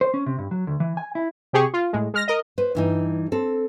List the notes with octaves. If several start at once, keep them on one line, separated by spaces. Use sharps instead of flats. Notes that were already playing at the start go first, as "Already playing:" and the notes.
C5
C#4
C3
G2
F#3
D2
E3
G#5
E4
C3 G4 G#4 C#6
F4
A2 G#3
G#3 F6 A#6
A#4 D#5
B4 C5
G2 E3 D#4
C4 A4